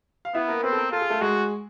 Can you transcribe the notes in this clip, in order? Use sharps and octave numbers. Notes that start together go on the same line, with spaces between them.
F5
B3 E4 E5
A#3 A#4
B3 C4 B4
A4
A#3 A#4
F4 A4
G#4
A3 A4
G#3 F#4 G#4